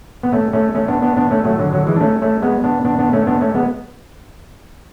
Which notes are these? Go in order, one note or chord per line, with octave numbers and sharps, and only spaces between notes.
B3
A3 C#4
A3 C#4
A3 C#4
B3 D4
B3 D4
B3 D4
A3 C#4
F#3 A3
D3 F#3
D3 F#3
E3 G#3
D4
A3 C#4
A3 C#4
G#3 B3
B3 D4
B3 D4
B3 D4
A3 C#4
B3 D4
A3 C#4
G#3 B3